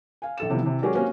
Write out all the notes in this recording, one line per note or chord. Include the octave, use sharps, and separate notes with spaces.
F5 G#5
A#1 A4 E7
C3 E3 F3 G3 B3
C3 E3
F#3 G#3 C#4 G4 A#4 D5
A#3 C4 C#4 F#4 G4 A#4